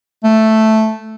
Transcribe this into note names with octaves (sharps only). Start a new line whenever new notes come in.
A3